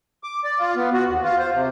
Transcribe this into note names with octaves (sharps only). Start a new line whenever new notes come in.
D6
D5
F4
B3
F#4
D#2
F4
C5
C3